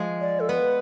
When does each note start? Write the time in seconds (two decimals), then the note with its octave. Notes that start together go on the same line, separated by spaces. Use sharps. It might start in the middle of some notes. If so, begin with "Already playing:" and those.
Already playing: F3 G#3
0.21 D5
0.40 A4
0.49 B3 B4